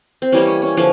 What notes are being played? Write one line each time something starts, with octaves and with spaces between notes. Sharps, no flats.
C4
E3 G3 A#3 C#4
C#4
C#4
D3 F3 A#3